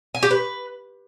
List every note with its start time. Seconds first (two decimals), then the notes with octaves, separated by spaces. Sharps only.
0.15 G#5
0.23 G4
0.31 B4